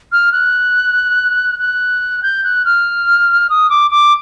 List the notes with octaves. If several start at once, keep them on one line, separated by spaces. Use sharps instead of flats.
F6
F#6
F#6
G6
F#6
F6
D#6
D6
D6